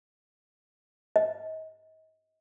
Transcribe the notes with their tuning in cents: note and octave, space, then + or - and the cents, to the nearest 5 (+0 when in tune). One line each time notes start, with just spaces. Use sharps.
D#5 +35